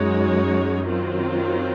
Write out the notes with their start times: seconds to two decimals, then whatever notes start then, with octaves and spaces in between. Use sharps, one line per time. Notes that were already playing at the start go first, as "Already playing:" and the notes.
Already playing: F#2 G#3 D#4 F#4 C#5
0.86 D#3 F#3 C4 F4